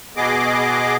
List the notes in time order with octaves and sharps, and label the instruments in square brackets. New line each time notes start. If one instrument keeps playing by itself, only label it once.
[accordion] B2 B3 G#4 D#5 D6